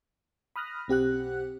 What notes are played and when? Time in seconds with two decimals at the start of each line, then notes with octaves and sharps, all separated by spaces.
0.56 B5 D#6 F6 F#6 A#6
0.88 B1 C4 G4 F#5 F#6